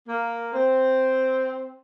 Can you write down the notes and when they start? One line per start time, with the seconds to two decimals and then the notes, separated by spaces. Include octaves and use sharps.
0.07 A#3
0.54 C4